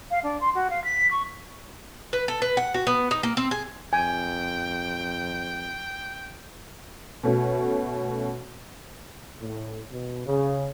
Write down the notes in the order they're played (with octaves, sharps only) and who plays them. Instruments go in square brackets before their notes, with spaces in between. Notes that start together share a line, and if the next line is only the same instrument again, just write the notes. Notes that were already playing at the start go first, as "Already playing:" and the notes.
[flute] F5
D4
C6
F#4
F5
B6
C#6
[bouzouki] B4
A4
B4
F#5
F#4
B3
D#4
A#3
C4
G#4
[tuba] F2 [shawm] G5 [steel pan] G#5
[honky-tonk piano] B2 A3 C#4
[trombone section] A2
B2
C#3